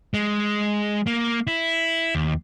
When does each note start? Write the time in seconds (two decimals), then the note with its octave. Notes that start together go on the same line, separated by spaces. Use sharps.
0.14 G#3
1.07 A#3
1.47 E4
2.15 D#2